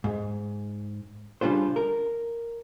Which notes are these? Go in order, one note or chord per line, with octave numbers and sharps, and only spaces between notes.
G#2
C#3 G3 D4 F4 C5
A#4